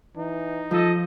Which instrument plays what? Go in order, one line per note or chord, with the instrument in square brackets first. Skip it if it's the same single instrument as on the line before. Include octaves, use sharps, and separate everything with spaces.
[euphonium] E3 [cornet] D#4
[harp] F3 [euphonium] F4 [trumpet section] A4 D#5